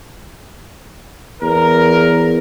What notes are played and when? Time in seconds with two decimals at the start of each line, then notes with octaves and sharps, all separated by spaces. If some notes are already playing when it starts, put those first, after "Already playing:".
1.41 E2 A#4